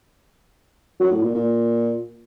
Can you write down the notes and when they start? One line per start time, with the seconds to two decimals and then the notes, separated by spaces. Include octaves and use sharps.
1.00 F#3
1.12 A2
1.23 A#2
1.34 A#2